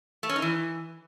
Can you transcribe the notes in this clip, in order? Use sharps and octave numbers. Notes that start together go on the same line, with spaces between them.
A3
C#4
D#4
E3